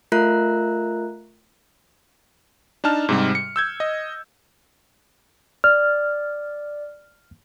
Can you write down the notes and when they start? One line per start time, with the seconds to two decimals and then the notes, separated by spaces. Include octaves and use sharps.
0.12 A3 F4 A#4 E5 A#5 F#6
2.84 D4 D#4 A5 F6
3.09 G#2 C3 G3
3.35 C#7
3.56 E6 G6 G#6
3.80 D#5
5.64 D5 F6